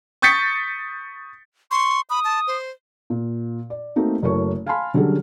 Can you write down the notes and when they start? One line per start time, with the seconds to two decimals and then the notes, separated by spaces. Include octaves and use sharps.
0.22 C#6 D#6 G6 A6 B6 C#7
1.71 C6 C#6
2.10 B5 D#6
2.24 A5
2.47 C5
3.10 A#2
3.70 D5
3.96 A3 A#3 C4 D#4 F#4
4.22 F#1 A3 E4 A#4 C#5 C#6
4.66 F5 G#5 A5 B5 C6 F6
4.94 D3 F#3 G3 C#4 G#4 A4